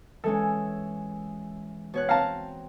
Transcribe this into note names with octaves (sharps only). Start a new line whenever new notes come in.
E3 G#3 C#4 A4
B2 C#5 F#6
C4 F5 A5 A#5